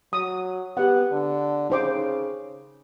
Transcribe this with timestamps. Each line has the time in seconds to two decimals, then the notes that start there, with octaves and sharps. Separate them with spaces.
0.13 F#3 D#6
0.77 B3 G4 F#5
1.12 D3
1.70 C#3 D#4 C5 D6